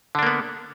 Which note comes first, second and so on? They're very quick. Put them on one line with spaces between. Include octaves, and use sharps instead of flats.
D3 D4 A#3 B3